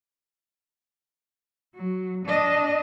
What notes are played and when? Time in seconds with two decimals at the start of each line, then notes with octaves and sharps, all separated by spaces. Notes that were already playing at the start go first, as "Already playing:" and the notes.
1.75 F#3
2.26 D4 D#5